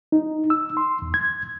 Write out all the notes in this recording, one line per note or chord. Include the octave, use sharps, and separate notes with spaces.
D#4
E6
C6
E2
G#6